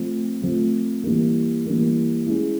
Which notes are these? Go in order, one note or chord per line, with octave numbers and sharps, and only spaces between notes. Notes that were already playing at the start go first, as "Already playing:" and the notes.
Already playing: F3 A3 C4
F3 A3 C4
E3 G3 A#3
E3 G3 A#3
G#3 C#4 E4